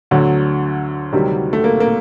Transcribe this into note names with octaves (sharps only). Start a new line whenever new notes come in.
D2 D3 F#3
D2 C3 D#3 F#3 G3
A3
A#3
A#3